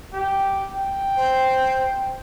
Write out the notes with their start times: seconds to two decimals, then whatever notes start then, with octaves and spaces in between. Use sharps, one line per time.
0.13 G4
0.72 G5
1.17 C5